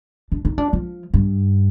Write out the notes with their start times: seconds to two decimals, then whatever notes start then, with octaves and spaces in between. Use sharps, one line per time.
0.32 D4
0.45 D#4
0.58 D4
0.73 F3
1.14 G2